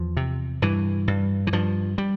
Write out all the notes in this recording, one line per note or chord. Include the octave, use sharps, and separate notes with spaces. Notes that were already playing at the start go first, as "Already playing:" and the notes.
Already playing: E2 F3
C3
G2 E3
G2
E3
G2 F3
G3